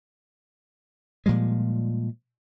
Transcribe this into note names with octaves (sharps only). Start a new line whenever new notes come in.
A#2 F3 G3 G#3